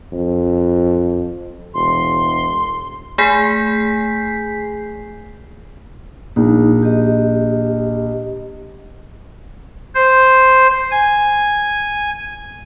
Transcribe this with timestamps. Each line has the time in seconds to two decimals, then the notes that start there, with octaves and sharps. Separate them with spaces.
0.12 F2
1.74 E1 C6
3.18 A3 G#4 G#5 G6 B6 C7
6.36 A#1 D#4
6.83 G4 D#5
9.95 C5
10.91 G#5